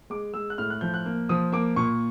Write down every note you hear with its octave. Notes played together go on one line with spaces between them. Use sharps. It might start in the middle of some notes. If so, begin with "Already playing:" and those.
G#3 D6
G#3 E6
F#6
A2 F6
F#6
F3 G6
F#6
A#3
F3 D#6
A#3 D6
A#2 C#6